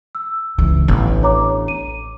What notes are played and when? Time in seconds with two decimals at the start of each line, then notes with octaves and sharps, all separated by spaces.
0.15 E6
0.58 C#2 E3
0.88 A1 B3 D4
1.23 C#5 A#5 D6
1.68 D#7